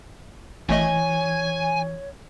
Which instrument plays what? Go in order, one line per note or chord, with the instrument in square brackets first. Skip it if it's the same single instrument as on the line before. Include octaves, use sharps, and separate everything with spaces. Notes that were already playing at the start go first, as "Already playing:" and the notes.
[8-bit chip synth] G#1 A3 D#5 [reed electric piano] E3 [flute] C#5 [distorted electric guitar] G#5